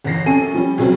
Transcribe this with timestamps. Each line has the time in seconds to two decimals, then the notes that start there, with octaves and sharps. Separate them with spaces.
0.04 G1 E2 A#6 C7
0.26 F#2 C3 C#4 A4 G#5 D#7
0.54 F3 G3 C#4
0.78 F2 C#3 F#3 C4